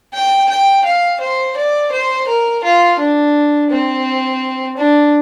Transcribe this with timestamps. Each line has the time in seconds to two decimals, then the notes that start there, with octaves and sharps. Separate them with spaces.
0.14 G5
0.50 G5
0.85 F5
1.21 C5
1.57 D5
1.92 C5
2.28 A#4
2.64 F4
2.99 D4
3.70 C4
4.77 D4